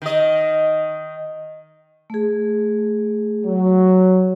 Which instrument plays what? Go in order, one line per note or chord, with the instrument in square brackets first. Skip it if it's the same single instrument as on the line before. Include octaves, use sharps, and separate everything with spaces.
[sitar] D#3 D#5
[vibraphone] A3 G#4
[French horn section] F#3